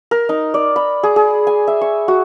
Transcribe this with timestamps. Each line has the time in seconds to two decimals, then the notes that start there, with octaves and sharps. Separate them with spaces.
0.11 A#4
0.29 D#4
0.54 D5
0.76 B5
1.03 G#4
1.16 G#4
1.47 G#5
1.67 E5
1.81 C#6
2.08 F#4